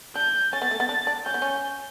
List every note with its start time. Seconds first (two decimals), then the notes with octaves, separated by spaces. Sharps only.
0.15 D4 G6
0.53 C#4 A6
0.62 B3
0.71 A3
0.80 B3
0.89 D4
1.07 D4
1.26 C#4 G6
1.34 B3
1.42 C#4